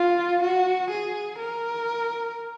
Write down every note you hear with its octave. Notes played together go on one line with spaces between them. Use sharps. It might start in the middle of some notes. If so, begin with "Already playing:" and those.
Already playing: F4
F#4
G#4
A#4